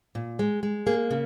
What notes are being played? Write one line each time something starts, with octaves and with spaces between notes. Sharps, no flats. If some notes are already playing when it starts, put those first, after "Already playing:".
A#2
G#3
G#3
A#3 G#4
C#3